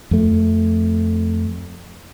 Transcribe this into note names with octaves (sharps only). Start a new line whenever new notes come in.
F2 A3